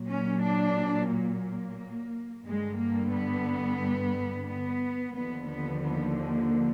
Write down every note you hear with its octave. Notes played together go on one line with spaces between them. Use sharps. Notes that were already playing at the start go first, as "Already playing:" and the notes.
Already playing: A#2 F#3
C#4
D4
A#3
G2 D3 G3 G#3
A#3
B3
B3
D#2 D3 F3 B3
B3
B3
A#3